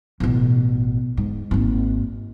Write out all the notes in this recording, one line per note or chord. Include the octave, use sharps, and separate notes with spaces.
A1 B2
G#2
G#1 A#3